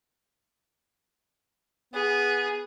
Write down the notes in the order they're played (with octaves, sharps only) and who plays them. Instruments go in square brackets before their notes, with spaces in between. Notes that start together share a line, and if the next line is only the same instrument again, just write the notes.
[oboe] B3 [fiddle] G#4